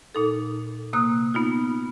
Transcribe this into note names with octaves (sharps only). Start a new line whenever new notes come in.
A#2 D#4 A4
C3 A#3 D#6 F#6
B3 D#4 F4